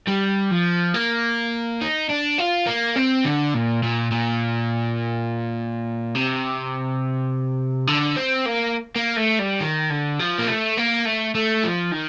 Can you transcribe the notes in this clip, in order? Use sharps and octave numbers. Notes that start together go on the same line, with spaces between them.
G3
F3
A#3
D#4
D4
F4
A#3
C4
D3
A#2
A#2
A#2
C3
D3
C4
A#3
A#3
A3
G3
D#3
D3
F3
A#3
A3
A#3
A3
A3
F3
D#3